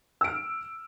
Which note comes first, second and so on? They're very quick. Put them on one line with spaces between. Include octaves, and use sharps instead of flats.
E6 D7 F6